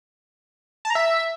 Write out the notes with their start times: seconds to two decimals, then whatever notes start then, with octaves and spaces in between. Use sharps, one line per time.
0.85 A5
0.90 A#5
0.95 E5